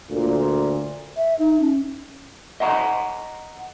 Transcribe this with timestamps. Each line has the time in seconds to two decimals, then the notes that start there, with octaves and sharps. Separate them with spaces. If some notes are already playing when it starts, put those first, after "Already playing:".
0.11 D2 A#2
1.16 E5
1.39 D#4
1.60 C#4
2.60 D#5 F#5 A#5 C6